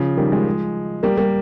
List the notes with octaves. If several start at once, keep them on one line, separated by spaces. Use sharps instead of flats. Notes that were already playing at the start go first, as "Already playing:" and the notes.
Already playing: C#3 F3
D#3 G3
F3 G#3
G3 A#3
G3 A#3